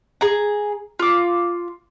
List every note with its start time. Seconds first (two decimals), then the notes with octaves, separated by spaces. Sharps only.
0.21 G#4 A#5
1.00 F4 D6